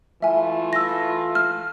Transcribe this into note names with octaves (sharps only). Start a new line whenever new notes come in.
E3 A3 F4 E5 G#5
E6 A#6
F6